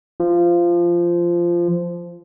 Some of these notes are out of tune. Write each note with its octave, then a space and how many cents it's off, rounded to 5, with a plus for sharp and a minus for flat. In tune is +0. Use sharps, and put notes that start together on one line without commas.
F3 -15